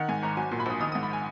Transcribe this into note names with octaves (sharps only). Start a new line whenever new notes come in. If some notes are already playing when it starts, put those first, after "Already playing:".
Already playing: D#3 F#5
G#2 G#5
G#1 A#5
F#3 G#5
A#2
B5
A#1 D#6
D#3 D#6
G#2 D#6
B5
G#5